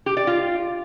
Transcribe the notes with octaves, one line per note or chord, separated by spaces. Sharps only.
G4
D5
F4